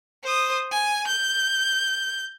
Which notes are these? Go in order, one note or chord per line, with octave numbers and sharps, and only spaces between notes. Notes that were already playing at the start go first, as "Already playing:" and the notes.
C5 D#6
G#5
G6